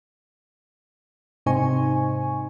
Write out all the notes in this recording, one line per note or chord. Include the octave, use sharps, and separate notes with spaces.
G#2 C3 D#4 C5 G#5 C#6